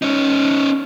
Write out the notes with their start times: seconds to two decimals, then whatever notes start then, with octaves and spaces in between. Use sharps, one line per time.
0.02 C#4 D#4